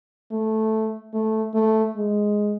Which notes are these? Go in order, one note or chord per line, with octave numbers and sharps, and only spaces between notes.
A3
A3
A3
G#3